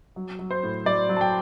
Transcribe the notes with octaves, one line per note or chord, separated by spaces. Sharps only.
F#3
F#3
C5
A2
F#3 D5
F#3
A5
G5